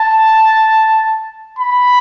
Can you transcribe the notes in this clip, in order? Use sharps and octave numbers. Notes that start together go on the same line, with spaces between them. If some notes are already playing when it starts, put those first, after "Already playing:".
Already playing: A5
B5